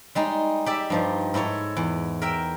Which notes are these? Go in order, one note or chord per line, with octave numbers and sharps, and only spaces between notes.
G3 G#3 D#4
G4 D5 E5
G2 F3 D#4
G#2 E4 A4 C#5
E2
A#4 E5 G5